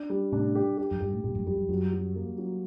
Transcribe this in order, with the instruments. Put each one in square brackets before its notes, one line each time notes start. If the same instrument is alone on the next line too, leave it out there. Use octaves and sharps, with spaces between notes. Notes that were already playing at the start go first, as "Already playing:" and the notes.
Already playing: [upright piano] D4
G3
[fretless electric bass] A2 C3 [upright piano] D4
[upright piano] G4
G4
[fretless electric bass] F#2
[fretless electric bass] G2 [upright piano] G4
[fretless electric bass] A2
[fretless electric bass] G2 A#2 [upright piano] G3
[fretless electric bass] F#2 A2
[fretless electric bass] F#2 [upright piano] G3
[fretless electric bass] F#2
[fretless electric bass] F#2 [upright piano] F#3
[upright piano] F#3
A#3
F#3